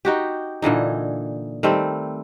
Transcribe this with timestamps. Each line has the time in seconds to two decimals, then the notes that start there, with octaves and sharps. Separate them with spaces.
0.05 D#4 F#4 G4
0.62 A#2 D3 E3 D#4
1.63 D#3 G3 A3 C4